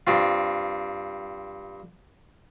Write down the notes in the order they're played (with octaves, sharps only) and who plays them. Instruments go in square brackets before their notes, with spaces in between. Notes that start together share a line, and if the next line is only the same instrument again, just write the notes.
[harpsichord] G2 C4 F4